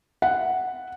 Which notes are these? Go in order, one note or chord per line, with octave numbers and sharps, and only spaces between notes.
F#5